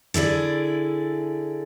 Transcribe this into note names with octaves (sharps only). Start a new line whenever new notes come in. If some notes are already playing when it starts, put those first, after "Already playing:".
D3 E4 G#4 D5